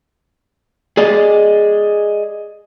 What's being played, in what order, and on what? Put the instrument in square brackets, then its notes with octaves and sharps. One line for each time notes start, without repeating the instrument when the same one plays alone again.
[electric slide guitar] G#4 D5 D#5